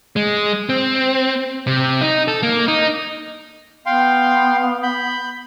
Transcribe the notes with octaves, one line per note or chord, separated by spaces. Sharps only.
G#3
C4
C3
D#4
A4
A#3
D#4
B3 F5 G5 C6
B5 G6